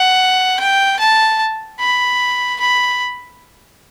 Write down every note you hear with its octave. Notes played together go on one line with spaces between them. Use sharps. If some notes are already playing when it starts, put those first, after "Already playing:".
Already playing: F#5
G5
A5
B5
B5